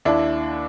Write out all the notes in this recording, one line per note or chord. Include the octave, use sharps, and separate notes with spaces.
D#2 D4 E4